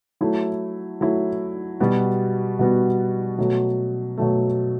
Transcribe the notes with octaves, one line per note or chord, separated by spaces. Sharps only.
F#3 A3 E4
F#3 A3 E4
B2 G3 B3 F#4
B2 G3 B3 F#4
B2 F#3 A3
B2 F#3 A3